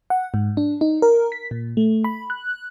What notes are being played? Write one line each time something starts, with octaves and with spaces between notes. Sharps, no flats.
F#5
G#2
D4
D#4
A#4
B6
A#2
A3
B5
F#6